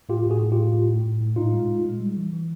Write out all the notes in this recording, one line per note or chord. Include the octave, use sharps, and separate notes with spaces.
A2 F4 G4
A2 F#4 G#4
A2
A2 F4 G4
A2
A2
A2
A2
A#2 D#4 F4
G#3
A#2
G#3
G3
E3
E3